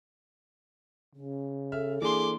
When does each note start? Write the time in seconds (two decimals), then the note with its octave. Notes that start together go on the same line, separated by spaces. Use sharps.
1.15 C#3 C#4
1.72 A4 E5 F6
2.02 E3 A#3 D4 G#4 C6 D6